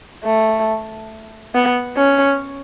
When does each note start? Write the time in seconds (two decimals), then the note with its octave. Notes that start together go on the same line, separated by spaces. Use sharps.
0.25 A3
1.55 B3
1.97 C#4